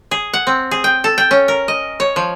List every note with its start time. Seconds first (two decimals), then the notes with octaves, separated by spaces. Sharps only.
0.11 G#4
0.34 F#5
0.47 C4
0.71 G#4
0.84 G5
1.04 A4
1.18 G5
1.31 C#4
1.48 A#4
1.68 D#5
2.00 C#5
2.16 F3